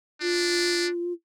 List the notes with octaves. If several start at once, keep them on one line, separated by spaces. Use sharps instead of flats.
D4 F4